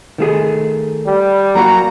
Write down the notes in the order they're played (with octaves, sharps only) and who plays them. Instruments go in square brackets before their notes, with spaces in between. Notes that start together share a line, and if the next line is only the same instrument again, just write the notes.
[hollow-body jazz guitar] D#3 A3 G#4
[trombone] G3
[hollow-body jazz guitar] F#3 A#3 F#4 [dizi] A#5